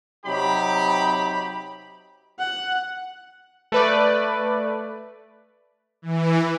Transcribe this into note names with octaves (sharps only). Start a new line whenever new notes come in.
C3 F#3 D#4 G4 B5
F#5
A3 B4 D5
E3